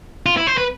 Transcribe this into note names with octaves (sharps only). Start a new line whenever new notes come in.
F4
E4
C5
B4